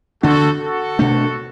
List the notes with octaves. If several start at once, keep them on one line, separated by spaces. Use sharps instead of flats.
D2 D3 G3 D4 F#4 A4
F#4 A4
B2 A3 D4